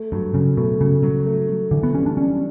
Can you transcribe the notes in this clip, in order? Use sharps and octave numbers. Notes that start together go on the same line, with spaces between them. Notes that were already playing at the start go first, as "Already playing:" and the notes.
Already playing: A3
G2 F#3
C#3 F#3
B2 A3
C#3 F#3
F#3
A3
F#3
D3 E3
B3
G3 C#4
D4
C#4 D4